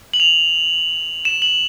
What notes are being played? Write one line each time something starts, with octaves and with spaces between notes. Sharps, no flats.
F#7
F7
E7
F#7